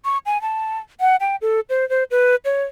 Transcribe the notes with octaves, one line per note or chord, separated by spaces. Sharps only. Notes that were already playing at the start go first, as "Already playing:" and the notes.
C#6
G#5
A5
F#5
G5
A4
C5
C5
B4
C#5